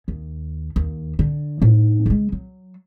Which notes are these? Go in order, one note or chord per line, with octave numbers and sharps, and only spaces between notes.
D#2
D#2
D3
A2 D#4
C#3 G#3
F#3